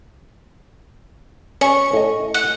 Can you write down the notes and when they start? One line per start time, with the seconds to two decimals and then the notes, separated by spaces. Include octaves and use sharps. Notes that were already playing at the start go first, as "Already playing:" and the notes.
1.61 C#4 C#6
1.93 A2 D#5
2.34 F#5